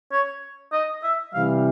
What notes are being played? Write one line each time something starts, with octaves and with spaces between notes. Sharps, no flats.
C#5
D#5
E5
C3 E3 G3 F5